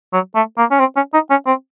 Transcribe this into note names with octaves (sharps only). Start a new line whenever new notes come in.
F#3
A3
A#3
C#4
C4
C#4
D#4
C#4
C4